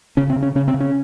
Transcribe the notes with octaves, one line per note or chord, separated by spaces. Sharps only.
C#3 C#4
C4
C#3
C#4
C#3 C#4
C4
C#3
C#4